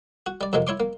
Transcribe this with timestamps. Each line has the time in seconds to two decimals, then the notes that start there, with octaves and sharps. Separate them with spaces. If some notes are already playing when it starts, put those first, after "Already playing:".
0.26 F#4
0.41 G3 D5
0.53 F2 C3 F#3 G#3 A#3
0.67 E4 C#5 C6 D6
0.80 A#3